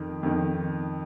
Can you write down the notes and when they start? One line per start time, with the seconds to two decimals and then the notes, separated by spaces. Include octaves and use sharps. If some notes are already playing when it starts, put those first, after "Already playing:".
Already playing: F2 D#3
0.23 F2 D#3